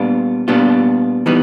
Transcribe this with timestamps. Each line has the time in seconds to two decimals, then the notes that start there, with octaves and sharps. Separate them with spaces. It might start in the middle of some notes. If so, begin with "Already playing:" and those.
Already playing: A#2 G3 B3 D4 F4
0.48 A#2 G3 B3 D4 F4
1.26 E3 G3 B3 D#4